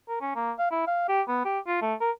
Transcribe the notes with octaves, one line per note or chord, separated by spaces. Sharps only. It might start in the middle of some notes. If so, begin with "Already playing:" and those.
A#4
C#4
A#3
F5
E4
F5
G4
B3
G4
F4
A3
A#4